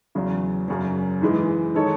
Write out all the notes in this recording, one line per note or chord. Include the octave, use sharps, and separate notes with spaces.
E2 C#3 F#3
F#2 C#3 F#3
G#2 E3 G#3
D#3 G#3 D#4 A4 C#5